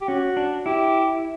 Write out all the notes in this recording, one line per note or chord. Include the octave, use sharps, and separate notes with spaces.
G4
C#4 F#4
D4
E4 G4